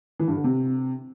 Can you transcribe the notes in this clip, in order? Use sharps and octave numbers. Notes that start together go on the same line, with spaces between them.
E3
G2
D3
C3